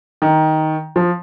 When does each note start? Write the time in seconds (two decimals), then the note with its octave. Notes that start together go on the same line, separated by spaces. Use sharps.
0.22 D#3
0.96 F3